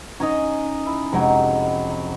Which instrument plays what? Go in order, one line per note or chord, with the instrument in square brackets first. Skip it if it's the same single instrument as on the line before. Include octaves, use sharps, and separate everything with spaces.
[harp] C#4 D#4 [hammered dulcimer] D#5 G#5 A#5
[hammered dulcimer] E4
[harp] F1 G#3 G5 [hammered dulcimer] C3 F#3